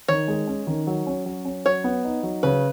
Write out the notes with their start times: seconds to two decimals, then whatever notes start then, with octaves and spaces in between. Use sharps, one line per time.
0.08 D#3 C#5
0.28 G#3
0.47 C#4
0.67 D#3
0.87 F#3
1.07 C#4
1.26 F#3
1.45 C#4
1.65 F#3 C#5
1.84 B3
2.05 D#4
2.23 F#3
2.43 C#3 B4